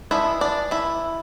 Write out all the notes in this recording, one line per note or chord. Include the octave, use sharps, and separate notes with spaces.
G#3 B3 D4 E4 E5
D4 D5
E4 E5